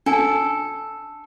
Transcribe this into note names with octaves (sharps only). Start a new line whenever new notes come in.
D4 A4 G#5